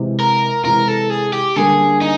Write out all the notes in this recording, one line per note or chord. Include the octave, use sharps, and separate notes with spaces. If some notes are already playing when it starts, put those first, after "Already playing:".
Already playing: C3 E3 G#3
A#4
C3 E3 G#3 A#4
A4
G#4
G4
D3 G3 A#3 D4 G#4
D#4